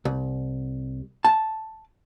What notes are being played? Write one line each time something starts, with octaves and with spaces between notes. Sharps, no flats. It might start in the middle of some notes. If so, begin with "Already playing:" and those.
C2
A5